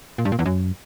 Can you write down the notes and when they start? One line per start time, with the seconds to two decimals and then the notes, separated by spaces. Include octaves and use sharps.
0.18 A#2
0.25 G2
0.32 A#2
0.39 E2
0.46 F#2